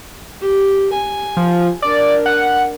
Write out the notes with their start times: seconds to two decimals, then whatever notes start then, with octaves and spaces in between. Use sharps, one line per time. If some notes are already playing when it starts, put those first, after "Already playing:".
0.41 G4
0.93 G#5
1.37 F3
1.82 D4 A#4 D5
2.26 F#5